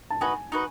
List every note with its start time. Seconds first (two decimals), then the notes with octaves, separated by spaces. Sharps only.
0.10 A5
0.21 D#4 F#4 B4 G#5
0.52 D#4 F#4 B4